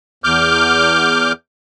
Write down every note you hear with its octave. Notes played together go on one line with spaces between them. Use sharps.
E2 D6 F6 G6